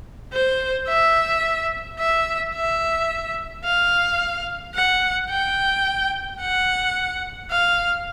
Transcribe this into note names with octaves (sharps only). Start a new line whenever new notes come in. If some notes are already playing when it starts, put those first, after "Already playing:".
C5
E5
E5
E5
F5
F#5
G5
F#5
F5